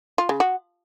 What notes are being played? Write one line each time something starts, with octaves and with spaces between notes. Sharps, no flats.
F4
C#3
F#4